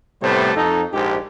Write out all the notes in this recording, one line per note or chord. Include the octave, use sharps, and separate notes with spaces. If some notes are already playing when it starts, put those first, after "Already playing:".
A2 C3 G3 A3 B3 C5
F2 D#4 A4
A#1 G#2 G4